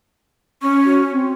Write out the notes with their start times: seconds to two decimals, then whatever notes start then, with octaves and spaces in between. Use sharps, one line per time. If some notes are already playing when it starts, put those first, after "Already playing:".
0.62 C#4 C#6
0.85 F#4
1.12 C4